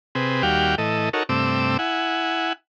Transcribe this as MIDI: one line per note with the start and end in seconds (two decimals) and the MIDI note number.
0.15 0.43 48
0.15 0.43 60
0.15 0.43 68
0.15 0.43 71
0.43 0.75 39
0.43 0.75 55
0.43 0.75 66
0.43 0.75 67
0.43 0.75 77
0.43 0.75 79
0.78 1.09 45
0.78 1.09 52
0.78 1.09 69
0.78 1.09 75
1.13 1.23 63
1.13 1.23 66
1.13 1.23 69
1.13 1.23 70
1.13 1.23 73
1.29 1.77 43
1.29 1.77 48
1.29 1.77 57
1.29 1.77 60
1.29 1.77 86
1.29 1.77 88
1.79 2.53 64
1.79 2.53 78
1.79 2.53 80